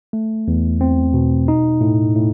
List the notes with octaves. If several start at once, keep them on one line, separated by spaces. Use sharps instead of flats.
A3
E2
C4
B2
D#4
A2
A2